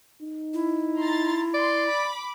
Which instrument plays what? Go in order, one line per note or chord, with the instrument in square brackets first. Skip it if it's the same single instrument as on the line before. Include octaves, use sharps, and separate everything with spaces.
[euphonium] D#4
[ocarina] E4
[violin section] A#5 C6 A6
[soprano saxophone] D5 [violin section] C6
[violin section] B5 D6